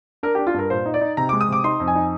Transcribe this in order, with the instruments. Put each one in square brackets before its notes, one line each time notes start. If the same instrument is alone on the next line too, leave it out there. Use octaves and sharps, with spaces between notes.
[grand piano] D4 A#4
G4
D4
F4
G2 A#4
A#2 C5
D#4
D5
D#4
C3 A#5
D6
G#3
D#6
C3 D6
D#4 C6
F2
G#5
D#4